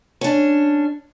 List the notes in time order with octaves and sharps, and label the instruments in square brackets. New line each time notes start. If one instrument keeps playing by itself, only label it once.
[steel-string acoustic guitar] C#4 D4